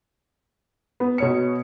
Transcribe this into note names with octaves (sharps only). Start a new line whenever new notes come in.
B3
B2 C#5 C#7